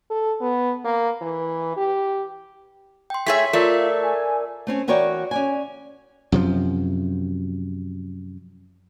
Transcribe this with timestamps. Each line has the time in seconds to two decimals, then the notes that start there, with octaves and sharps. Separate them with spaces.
0.10 A4
0.41 B3
0.85 A#3
1.21 E3
1.77 G4
3.10 G5 C6
3.26 A3 G#4 C#5 E5 C6 B6
3.53 A3 F4 A#4 D5 E6
4.03 G#5
4.67 A3 C4 C#4
4.88 E3 F#4 A#4 C#5 D5 G5
5.31 C#4 D5 G#5
6.32 F#2 C3 F3